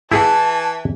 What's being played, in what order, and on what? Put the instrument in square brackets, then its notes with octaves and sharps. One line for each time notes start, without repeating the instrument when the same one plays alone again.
[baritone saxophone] E3 [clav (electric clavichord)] E4 G#4 F#5 [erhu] A5